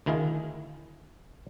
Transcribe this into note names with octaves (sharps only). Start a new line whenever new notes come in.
D2 D#3 E4 G#4 F5